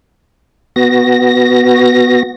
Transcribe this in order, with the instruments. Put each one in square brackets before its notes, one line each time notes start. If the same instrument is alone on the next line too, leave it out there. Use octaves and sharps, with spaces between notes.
[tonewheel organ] B3 F#4 A#6